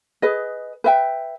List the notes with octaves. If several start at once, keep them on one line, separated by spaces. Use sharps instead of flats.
G#4 B4 D#5
B4 E5 G5